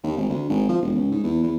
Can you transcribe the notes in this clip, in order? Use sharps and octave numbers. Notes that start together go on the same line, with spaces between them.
D#2
G#1
D2
G#1
F3
E1
C#2
G#2
E2
E2